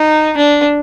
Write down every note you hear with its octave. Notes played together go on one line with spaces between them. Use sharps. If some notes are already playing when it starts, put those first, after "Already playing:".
Already playing: D#4
D4